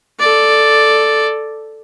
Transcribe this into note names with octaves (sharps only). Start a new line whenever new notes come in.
A4 D5